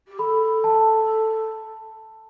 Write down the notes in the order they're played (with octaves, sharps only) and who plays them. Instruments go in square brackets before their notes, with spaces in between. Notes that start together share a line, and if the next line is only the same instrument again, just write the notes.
[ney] G4
[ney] A4 [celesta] B5
[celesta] A5